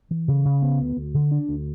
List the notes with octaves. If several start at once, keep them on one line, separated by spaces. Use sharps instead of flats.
E3
C#3
C#3
B3
D2
D2
D3
D4
D2